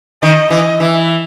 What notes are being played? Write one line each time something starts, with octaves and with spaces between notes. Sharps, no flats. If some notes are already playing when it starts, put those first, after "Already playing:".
D#3 D#5
E3 D#5
E3 E5